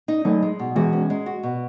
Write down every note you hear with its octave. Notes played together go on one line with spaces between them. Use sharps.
D#4
F#3 A3 D#4
G#3
B2
E3 G#3 F#4
C#4
G#3
F#4
B2